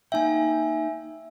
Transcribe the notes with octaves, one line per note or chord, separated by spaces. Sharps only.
A#3 D#4 E5 G5 G#5